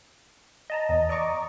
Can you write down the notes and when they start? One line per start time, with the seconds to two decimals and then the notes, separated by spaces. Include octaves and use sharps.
0.70 D#5 A5 A#5
0.89 E2 D#5
1.09 D5 D#5 A#5 C#6 D6